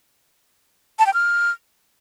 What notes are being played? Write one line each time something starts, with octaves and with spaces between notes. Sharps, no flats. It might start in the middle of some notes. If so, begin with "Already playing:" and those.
A5
G5
F6